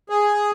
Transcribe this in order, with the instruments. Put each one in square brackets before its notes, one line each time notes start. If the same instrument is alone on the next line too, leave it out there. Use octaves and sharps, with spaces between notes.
[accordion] G#4